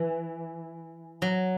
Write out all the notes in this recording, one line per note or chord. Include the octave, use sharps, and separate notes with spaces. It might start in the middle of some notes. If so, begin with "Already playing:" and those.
Already playing: E3
F#3